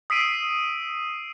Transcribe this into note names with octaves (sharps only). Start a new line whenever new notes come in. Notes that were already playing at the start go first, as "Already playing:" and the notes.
D#6 E6 B6 C7 D7 D#7